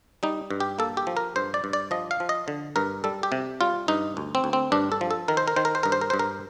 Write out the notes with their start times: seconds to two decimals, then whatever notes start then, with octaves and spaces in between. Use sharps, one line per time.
0.23 G3 D#4
0.51 G2
0.60 G4
0.79 A#3 A4
0.97 G4
1.07 F3
1.17 A#4
1.36 G2 C5
1.54 D5
1.64 G2
1.73 D5
1.91 F3 D#5
2.11 F5
2.20 F3
2.29 D#5
2.48 D3
2.76 G2 A#4
3.04 G3 A4
3.23 G4
3.32 C3
3.61 G3 F4
3.88 G2 D#4
4.17 D2
4.35 C4
4.44 D2
4.53 C4
4.72 G2 D4
4.92 A4
5.01 F3
5.11 A4
5.28 D#3 A#4
5.37 C5
5.48 A#4
5.56 D#3 C5
5.65 A#4
5.75 C5
5.83 G2 A#4
5.92 C5
6.01 A#4
6.10 G2 C5
6.19 A#4